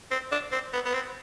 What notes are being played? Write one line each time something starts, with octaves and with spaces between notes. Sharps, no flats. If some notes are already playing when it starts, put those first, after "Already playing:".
C4
D4
C4
B3
B3
C4